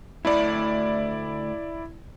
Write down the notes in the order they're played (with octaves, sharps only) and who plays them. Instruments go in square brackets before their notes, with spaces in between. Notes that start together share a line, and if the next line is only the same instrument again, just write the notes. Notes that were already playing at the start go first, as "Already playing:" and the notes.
[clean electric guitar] D2 A3 B5 [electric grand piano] E4 D5